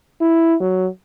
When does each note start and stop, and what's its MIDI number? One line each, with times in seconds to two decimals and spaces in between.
0.21 0.55 64
0.61 0.87 54